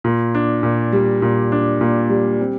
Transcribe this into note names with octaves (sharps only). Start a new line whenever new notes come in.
A#2
D4
A#2
G3
A#2
D4
A#2
G3
C4